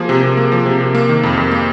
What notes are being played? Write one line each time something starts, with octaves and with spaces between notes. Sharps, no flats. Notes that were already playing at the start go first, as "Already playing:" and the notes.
Already playing: F3 A#3 G#4
C3
C3
A#3
F3
C3
C3
A#3
D#3
F2
F2
A#3